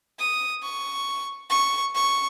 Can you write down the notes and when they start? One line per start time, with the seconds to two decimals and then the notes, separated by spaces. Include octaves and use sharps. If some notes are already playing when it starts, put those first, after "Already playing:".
0.19 D#6
0.63 C#6
1.50 C#6
1.95 C#6